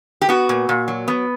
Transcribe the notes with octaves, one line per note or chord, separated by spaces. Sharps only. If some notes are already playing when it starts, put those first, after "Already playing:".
G4
B3 F#4
A#2
A#2
F#3
B3